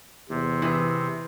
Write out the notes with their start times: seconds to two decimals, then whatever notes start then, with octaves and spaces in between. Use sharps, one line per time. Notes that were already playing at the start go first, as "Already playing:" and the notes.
0.29 E2 C3
0.62 E3 G#4